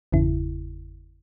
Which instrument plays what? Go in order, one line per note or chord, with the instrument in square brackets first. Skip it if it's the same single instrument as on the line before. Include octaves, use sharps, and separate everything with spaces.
[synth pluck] G1 E2 C#3 E4